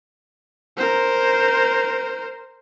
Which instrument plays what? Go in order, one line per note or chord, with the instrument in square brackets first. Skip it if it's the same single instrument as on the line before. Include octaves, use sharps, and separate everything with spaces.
[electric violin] A#4 C5